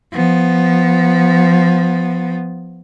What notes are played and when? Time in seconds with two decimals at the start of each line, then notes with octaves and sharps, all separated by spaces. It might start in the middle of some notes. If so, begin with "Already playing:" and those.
0.12 F3 B3